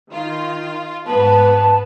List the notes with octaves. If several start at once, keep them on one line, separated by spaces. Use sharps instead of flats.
D#3 F4
G#2 B3 B4 A5